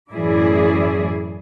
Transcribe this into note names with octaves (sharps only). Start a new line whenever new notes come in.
F#2 A2 E3 E4 G#4 D5